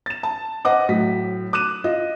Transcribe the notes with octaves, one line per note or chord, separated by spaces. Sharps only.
A6 E7
A5
C5 D#5 F#5 D6
A2 F#3 B6
D6 F#6 D#7 E7
F4 D#5